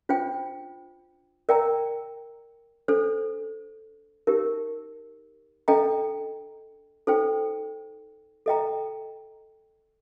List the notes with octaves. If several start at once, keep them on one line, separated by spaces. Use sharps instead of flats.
D4 F4 C5 G5
A#4 D5 G5 A#5
D4 A4 C5
D#4 G4 A#4
D4 A4 D#5 G5 A#5
D#4 A4 C5 G5
A4 D#5 G5 A#5